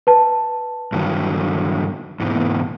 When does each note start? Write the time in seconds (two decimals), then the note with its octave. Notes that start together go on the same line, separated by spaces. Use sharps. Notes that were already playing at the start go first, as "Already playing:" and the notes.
0.07 B4 A5
0.92 G2 D#3 F#3
2.20 E2 G#2 B2